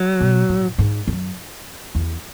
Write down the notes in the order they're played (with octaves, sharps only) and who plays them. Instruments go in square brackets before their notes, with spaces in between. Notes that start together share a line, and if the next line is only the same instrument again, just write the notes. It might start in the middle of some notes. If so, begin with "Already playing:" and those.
Already playing: [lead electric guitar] F#3
[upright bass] B2
A2
G#2
F#2
E2